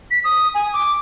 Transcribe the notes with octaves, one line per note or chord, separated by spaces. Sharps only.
B6
D#6
G#5
D6